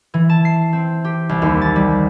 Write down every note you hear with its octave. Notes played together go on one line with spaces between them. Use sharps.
E3
A5
C7
C4
G4
C2
D#2
A6
G3